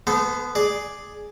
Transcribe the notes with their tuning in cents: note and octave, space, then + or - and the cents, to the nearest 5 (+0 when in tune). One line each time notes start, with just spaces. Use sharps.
B3 +0 A4 -30 C5 -35
G#4 +0 D5 +0